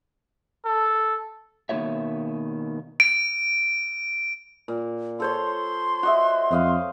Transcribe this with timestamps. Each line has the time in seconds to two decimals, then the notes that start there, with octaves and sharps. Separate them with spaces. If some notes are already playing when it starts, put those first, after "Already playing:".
0.65 A4
1.69 B2 D#3 A#3 F#4 C#5 E5
3.00 D7
4.68 A#2
5.20 A4 C5 C#5 C6
6.03 F#4 D#5 E5
6.51 F2 C5 D#5 F5